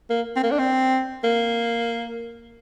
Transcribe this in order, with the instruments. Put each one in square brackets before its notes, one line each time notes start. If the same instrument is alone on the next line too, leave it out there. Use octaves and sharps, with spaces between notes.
[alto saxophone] A#3
C4
A#3
D4
C4
A#3